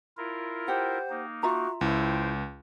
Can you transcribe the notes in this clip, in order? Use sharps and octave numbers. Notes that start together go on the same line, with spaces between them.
E4 F4 A#4
G4 C5 F#5
A#3 D#4
F4 F#4 E5 A#5
C#2 E4 C5 G5